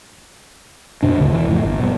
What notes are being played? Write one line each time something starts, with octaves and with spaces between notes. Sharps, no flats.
F#2 B2 D4
D1 D2 C#3
E1 E3
F2 A2 E3
G1
B2 G3